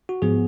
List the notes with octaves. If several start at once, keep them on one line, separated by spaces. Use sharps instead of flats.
F#4
G#2 F3 B3 G#4